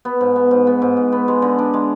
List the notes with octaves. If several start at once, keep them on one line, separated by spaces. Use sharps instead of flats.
B3
G#2
B3
G#2
B3
G#2
G#2
B3
G#3
D3
D4
G#3